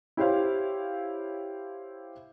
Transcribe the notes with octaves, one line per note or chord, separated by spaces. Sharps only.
E4 G4 C5 C#5 F5